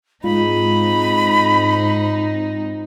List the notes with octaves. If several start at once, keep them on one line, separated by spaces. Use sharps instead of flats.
G#2 G#3 C4 D#4 F4 B5